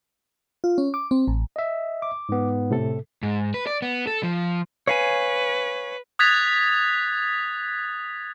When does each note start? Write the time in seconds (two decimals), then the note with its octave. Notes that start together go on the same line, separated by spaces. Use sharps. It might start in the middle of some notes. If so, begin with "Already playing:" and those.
0.64 F4
0.78 C#4
0.94 D6
1.11 C4
1.28 A1
1.56 D#5 E5
2.02 D6
2.29 G#2 B3
2.71 A2 C3 A4
3.23 G#2
3.54 B4
3.67 D5
3.82 B3
4.07 A4
4.23 F3
4.87 B4 C#5 F5 G#5
6.19 D#6 F#6 G#6 A6 B6 F7